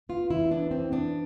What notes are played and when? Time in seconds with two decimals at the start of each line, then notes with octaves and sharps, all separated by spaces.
0.09 B3 F4
0.30 E3 E4
0.51 B3 D4
0.71 E3 C4
0.92 B3 D4